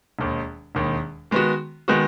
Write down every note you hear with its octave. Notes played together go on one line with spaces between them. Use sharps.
E1 D#2 D#3
E1 D#2 D#3
D#3 G#3 B3 F#4
D#3 G#3 B3 F#4